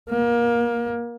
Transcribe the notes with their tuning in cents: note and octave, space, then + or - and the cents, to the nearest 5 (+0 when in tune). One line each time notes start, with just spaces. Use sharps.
A#3 +25